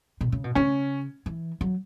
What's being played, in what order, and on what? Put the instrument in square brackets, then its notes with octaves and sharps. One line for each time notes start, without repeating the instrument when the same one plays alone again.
[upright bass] B2
C#3
B2
[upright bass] C#3 [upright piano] C#4
[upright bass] E3
F#3